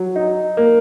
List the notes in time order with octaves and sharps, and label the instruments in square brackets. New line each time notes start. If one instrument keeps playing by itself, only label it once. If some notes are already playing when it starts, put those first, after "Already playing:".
Already playing: [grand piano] F#3
D#4
A#3